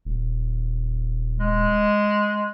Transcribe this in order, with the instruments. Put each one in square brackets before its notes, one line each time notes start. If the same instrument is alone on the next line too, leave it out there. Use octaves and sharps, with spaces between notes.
[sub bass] D#1
[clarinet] G#3